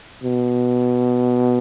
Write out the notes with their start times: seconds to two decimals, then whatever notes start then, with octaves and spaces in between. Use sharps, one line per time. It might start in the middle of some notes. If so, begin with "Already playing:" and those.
0.23 B2